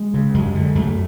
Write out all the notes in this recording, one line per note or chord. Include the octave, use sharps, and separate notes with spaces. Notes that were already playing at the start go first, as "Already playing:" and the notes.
Already playing: G#3
C#3
F#2 G#3
D3
F#2 A3